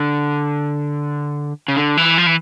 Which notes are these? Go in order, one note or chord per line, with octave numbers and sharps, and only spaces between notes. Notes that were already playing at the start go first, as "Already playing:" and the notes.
Already playing: D3
C#3
D3
E3
F3
E3